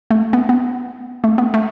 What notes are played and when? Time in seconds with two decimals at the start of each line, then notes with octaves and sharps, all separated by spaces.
0.10 A3
0.33 B3
0.49 B3
1.24 A3
1.38 B3
1.54 A3